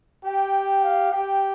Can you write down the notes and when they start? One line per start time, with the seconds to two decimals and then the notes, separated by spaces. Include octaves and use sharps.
0.24 G4 G5
0.83 F5
1.12 G4 G5